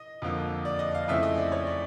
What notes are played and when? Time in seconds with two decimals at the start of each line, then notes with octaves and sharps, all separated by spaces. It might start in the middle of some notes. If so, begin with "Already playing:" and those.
Already playing: D#5
0.22 F2 D3 F3 A#3
0.65 D5
0.79 D#5
0.95 F5
1.08 F2 C#3 E3 A3 C4 E5
1.23 D#5
1.38 D5
1.52 C#5
1.67 D5